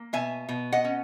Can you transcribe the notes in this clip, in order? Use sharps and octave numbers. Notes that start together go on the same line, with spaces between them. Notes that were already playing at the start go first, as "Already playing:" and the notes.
Already playing: A#3
B2 E5 G#5
B2
D#5 F#5
C#4